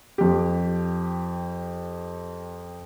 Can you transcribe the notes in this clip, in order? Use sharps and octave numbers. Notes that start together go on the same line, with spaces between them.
F2 G4